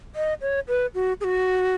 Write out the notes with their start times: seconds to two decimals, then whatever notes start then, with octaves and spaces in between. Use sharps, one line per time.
0.16 D#5
0.41 C#5
0.68 B4
0.95 F#4
1.21 G#4
1.24 F#4